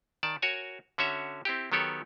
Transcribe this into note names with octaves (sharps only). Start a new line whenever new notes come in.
D#3 D5 A5
F#4 A#4 C#5 G#5
D3 C#4 F#4 C#5 E5
C4 E4 G4
D#3 F#3 B3 G4 A4 C#5